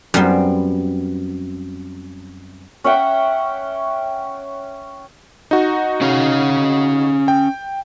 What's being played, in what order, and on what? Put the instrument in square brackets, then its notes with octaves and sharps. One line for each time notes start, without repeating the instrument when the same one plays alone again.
[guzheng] F#2 G3 B3 C4
[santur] C#4 E5 F#5 G5
[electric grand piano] D#4 F#4
[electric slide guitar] C#4 C#5 F5
[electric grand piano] G5